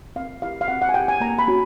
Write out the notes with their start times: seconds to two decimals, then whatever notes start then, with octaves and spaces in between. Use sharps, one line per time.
0.16 C4 F5
0.42 E4 G4 F5
0.61 F5
0.68 C4 F#5
0.82 F#5
0.89 G#5
0.94 E4 G4 G5
1.08 G#5
1.21 A#3 A#5
1.39 B5
1.48 C#4 F#4